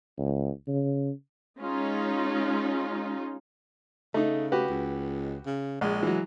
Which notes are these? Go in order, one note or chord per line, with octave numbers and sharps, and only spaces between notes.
C#2
C#3
G#3 C#4 D#4 F4
C#3 A3 D#4
F#4 G4 B4
C#2
C#3
A#1 G#3
E3 F#3